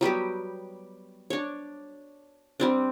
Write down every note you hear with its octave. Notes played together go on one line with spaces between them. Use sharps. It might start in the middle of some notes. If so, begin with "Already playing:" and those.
F#3 G3 B3 G4
D4 C#5
G3 C4 D4